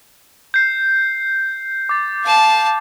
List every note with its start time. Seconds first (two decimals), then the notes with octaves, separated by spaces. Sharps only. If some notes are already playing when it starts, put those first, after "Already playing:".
0.54 G6 C7
1.89 D6 A6
2.24 F5 A5